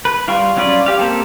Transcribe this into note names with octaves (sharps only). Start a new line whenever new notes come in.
B4
G3 F4 F5 G5 C#6
F#3 C#4 F4 B4 D5
G4 F5
A#3 C4 G4 A4